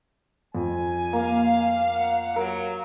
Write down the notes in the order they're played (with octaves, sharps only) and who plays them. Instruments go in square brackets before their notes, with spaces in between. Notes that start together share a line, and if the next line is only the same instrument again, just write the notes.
[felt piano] F2 [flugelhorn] G#5
[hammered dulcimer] A#3 [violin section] F5
[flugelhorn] F#5
[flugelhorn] F#3 [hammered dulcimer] A#4